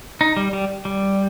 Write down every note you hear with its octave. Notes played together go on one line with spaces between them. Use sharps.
D#4
G3
G3
G3